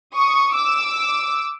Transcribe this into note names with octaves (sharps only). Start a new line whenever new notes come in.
C#6 D#6
D6 E6